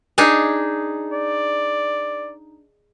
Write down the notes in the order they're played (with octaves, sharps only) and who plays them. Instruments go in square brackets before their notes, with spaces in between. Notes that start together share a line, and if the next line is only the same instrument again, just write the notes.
[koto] D4 D#4 G#4
[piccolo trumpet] D5